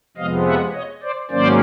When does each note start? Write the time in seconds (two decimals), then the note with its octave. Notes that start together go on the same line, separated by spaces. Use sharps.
0.17 F2 C3 F3 G#3 B3 D#5 F5
0.46 E5 F#5
0.74 C#5 D#5
1.02 C5 D5
1.31 G#2 D#3 F#3 A#3 C#4 C5 D5